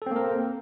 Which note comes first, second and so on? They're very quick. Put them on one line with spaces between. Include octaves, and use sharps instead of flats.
A4 C4 A#3 A#4